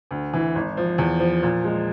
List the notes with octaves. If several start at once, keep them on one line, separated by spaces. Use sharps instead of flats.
D2
E3
G#1
F3
E2
F3
A#2
G#3